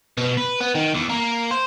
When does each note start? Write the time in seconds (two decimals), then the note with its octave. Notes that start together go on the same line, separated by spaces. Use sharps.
0.17 B2
0.37 B4
0.60 B3
0.75 D#3
0.95 E2
1.10 A#3
1.51 C5